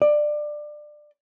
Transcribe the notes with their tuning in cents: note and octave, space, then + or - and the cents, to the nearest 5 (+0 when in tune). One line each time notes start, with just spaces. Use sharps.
D5 +20